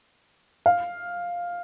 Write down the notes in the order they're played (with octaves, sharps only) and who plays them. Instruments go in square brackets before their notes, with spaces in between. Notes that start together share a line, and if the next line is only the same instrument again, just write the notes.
[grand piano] F5